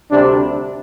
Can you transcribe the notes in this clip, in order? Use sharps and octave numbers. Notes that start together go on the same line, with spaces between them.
D2 C3 G3 C4 D4